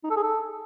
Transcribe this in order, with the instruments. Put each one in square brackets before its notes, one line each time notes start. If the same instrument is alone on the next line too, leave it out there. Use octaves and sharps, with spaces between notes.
[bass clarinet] D#4
A4
G#4
A4